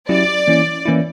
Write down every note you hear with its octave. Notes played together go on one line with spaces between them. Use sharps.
F#3 C#4 E4 G4 D5
E3 A#3 C#4 E4
E3 A#3 C#4 E4